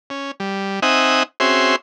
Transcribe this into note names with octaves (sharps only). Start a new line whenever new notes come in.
C#4
G3
C4 D#4 E5 F#5 G#5 D#6
C4 C#4 F#4 G#4 E5 C6